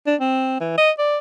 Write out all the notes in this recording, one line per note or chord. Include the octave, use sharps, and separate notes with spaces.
D4
C4
E3
D#5
D5